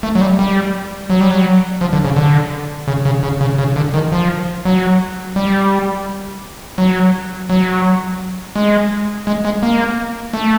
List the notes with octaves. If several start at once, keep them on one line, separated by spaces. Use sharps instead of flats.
A3
F#3
G3
G3
F#3
G3
F#3
F3
D3
C#3
D3
C#3
C#3
C#3
C#3
C#3
D3
D#3
F3
F#3
G3
F#3
F#3
G#3
G#3
G#3
A#3
A3